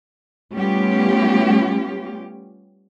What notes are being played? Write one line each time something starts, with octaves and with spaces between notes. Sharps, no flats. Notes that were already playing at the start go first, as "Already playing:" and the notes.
G3 A3 B3 C#4 F4 G4